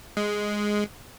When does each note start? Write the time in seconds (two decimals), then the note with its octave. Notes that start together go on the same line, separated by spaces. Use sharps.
0.17 G#3